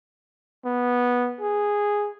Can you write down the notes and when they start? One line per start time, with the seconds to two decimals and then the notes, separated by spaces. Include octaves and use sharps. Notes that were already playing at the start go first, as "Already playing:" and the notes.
0.65 B3
1.40 G#4